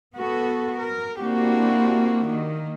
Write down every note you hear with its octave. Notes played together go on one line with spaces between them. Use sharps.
B3 F#4 A4
A#4
A#3 C4 D4 E4 F#4 G4
D#3 A#3